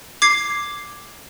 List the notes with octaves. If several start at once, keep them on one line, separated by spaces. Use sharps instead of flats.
D6 G#6 C7